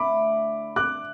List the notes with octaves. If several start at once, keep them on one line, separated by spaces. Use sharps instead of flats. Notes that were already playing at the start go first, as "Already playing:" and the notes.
Already playing: D3 A3 E4 B5 D6
D6 F#6